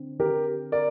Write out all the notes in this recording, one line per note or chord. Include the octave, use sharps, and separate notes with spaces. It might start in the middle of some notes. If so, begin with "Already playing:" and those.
Already playing: D3 C4
G4 A#4
A#4 D5